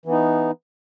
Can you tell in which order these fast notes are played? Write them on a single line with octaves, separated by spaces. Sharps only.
E3 B3 D#4